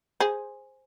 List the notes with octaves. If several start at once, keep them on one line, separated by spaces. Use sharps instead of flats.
G#4 C5